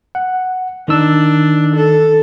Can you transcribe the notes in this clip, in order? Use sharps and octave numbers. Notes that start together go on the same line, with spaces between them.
F#5
D#3 D4 D#4 E6
A4